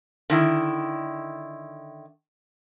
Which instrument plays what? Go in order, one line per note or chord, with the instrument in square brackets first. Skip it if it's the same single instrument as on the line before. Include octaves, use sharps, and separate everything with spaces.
[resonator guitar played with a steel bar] D3 D#3 E4